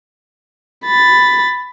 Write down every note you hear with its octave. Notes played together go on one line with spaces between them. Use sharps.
B5 A6